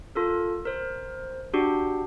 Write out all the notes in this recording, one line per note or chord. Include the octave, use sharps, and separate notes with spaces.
F4 A4 A#4
A#4 C5
D4 F#4 G4